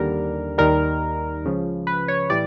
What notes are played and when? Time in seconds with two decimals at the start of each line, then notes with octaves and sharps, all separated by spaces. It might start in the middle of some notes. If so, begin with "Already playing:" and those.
Already playing: D#2 D3 G3 A#4
0.58 D#2 D#3 G3 A#4
1.44 C#2 C#3 F3
1.87 B4
2.08 C#5
2.30 A2 E3 G3 D5